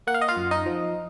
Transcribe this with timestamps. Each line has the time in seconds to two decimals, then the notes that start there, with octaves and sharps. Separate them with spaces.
0.07 A#3 F#5
0.14 F5
0.21 D#5
0.28 F4 F5
0.37 F#2
0.51 D#4 D#5
0.66 F3